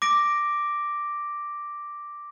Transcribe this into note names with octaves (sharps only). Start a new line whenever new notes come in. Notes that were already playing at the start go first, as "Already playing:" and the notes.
D6 A#6 D7